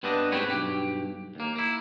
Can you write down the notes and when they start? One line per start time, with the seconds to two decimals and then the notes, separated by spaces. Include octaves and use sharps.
0.03 G2 B3 C4 D4 B4 D#5
0.32 G#2 C4 G4 B4 C#5
0.48 B1 G2 G4
1.35 D#2 A#3
1.56 A#3 E4